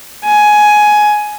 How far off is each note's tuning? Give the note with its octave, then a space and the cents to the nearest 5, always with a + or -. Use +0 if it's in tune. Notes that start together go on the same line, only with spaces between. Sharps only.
G#5 +15